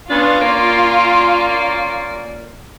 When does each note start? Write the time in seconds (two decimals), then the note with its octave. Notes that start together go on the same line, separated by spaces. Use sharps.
0.10 B3 C#4 D4 F4
0.40 A#3 C#4 D5